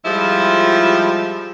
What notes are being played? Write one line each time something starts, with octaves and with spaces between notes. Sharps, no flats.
F3 G3 G#3 E4 F4 G4